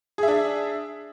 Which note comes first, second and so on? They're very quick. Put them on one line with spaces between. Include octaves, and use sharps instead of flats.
G#4 E5 D4